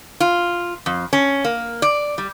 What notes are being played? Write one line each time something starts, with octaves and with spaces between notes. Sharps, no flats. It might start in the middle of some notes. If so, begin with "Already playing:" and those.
F4
F2
C#4
A#3
D5
G3